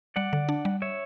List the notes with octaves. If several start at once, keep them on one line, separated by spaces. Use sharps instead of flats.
G3 D5 F#5
D3
D4
G3
C#5 E5